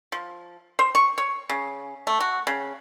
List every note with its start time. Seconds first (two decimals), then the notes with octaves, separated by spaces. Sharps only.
0.12 F3
0.79 C5
0.95 C#6
1.18 C#5
1.49 C#3
2.07 A3
2.20 F#4
2.47 C#3